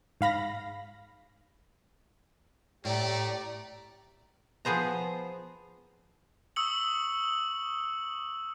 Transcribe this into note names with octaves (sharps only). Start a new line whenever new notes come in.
G#2 F5 B5 A#6
A2 A3 G4 D5 A#5
F3 B3 G#4 C5 A#5
C#6 D#6 E6 C#7 F#7